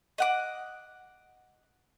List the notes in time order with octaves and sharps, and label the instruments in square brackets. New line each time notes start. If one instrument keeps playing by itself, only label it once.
[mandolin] D#5 F#5 D6